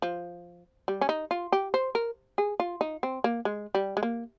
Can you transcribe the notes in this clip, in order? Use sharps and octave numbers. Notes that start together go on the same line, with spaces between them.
F3
G3
C#4
D#4
F4
G4
C5
A#4
G#4
F4
D#4
C4
A#3
G#3
G3
G#3
A#3